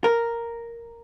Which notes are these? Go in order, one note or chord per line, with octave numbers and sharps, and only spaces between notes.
A#4